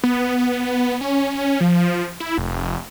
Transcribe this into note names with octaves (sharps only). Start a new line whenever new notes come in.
B3
C#4
F3
E4
F1